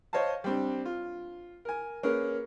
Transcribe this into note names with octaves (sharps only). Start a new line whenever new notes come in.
C5 C#5 D#5 F5 A5
G3 C4 D4
F4
A#4 G#5
A#3 C#4 G#4 A#4 B4